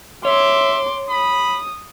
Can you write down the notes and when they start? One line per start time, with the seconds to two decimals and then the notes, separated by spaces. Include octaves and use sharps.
0.25 C#5 E5 C6 D6
1.09 B5 D#6